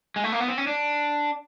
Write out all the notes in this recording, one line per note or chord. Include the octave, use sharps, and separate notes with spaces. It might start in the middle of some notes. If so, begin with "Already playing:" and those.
G#3
A3
A#3
B3
C4
C#4
D4